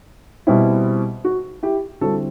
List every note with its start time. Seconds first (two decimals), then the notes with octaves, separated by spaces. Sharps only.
0.47 B2 G3 C4 E4
1.25 F#4
1.63 E4 G4
2.01 D3 G3 C4 E4 F#4 A4